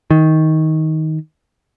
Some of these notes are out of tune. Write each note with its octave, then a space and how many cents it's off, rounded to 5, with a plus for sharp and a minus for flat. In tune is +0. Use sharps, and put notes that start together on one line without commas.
D#3 +15